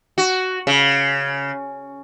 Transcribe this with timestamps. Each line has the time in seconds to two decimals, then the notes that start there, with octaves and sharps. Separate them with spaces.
0.18 F#4
0.67 C#3